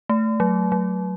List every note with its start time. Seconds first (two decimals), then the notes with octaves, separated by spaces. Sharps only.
0.09 A3
0.40 F#3
0.72 F#3